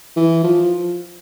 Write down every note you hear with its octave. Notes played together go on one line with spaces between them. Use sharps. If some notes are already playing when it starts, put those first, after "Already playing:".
E3
F3